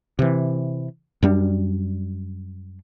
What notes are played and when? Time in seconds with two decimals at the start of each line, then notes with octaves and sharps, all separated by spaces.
0.19 C3 E3
1.22 F#2 G3 D4